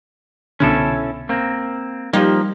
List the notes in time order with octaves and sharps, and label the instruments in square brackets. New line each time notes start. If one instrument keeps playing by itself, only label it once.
[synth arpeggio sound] C2 B2 D3 [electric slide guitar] C#4 E4 A4
[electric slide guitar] A#3 C4
[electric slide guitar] F3 A#3 [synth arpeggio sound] G3 D#4 G4